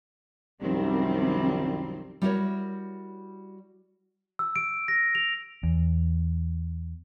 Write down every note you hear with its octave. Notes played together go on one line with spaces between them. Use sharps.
C2 F#2 D#3 F3 G3 C4
G3 E4 F#4 G4 A#4 C#5
E6
D7
A#6
F7
E2